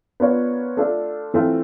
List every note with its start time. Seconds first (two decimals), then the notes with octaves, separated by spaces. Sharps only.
0.20 B3 D4 F4 A#4 C#5
0.77 A3 D4 F4 A4
1.34 E3 A3 C4 F4